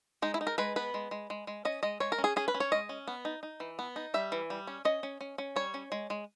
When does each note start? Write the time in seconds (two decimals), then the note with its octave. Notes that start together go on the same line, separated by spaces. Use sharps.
0.22 G#3 D#4
0.34 E4
0.41 D#4
0.47 A#4
0.58 G#3 B4
0.76 B3 B4
0.94 G#3
1.11 G#3
1.30 G#3
1.47 G#3
1.65 C#4 D#5
1.83 G#3 D#5
2.00 G#3 C#5
2.12 A#4
2.18 C#4
2.24 G#4
2.36 C#4 G#4
2.48 B4
2.54 C#4
2.60 C#5
2.72 G#3 D#5
2.89 C#4
3.08 B3
3.25 D#4
3.43 D#4
3.60 E3
3.79 B3
3.96 D#4
4.14 G3 E5
4.32 E3
4.50 G3
4.67 C#4
4.85 C#4 D#5
5.03 C#4
5.21 C#4
5.38 C#4
5.56 G3 C#5
5.74 C#4
5.92 G#3
6.10 G#3